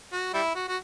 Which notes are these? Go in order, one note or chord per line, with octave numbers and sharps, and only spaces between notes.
F#4
G3 E4
F#4
F#4